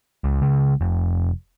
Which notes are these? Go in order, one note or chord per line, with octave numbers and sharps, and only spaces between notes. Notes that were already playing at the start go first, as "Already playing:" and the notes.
C#2
C#2
F1